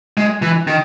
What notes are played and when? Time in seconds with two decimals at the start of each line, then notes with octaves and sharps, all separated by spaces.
0.17 G#3
0.42 E3
0.67 D#3